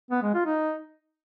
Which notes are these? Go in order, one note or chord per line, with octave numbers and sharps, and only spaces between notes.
B3
G#3
F4
D#4